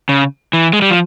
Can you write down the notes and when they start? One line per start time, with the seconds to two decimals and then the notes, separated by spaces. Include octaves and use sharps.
0.09 C#3
0.53 E3
0.73 G#3
0.82 G3
0.90 F3